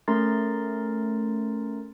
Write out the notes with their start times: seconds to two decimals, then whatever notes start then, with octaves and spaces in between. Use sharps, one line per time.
0.08 A3 C#4 A#4 A#5 C6 A6